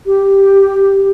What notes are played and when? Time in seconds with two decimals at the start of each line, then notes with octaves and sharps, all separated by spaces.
0.06 G4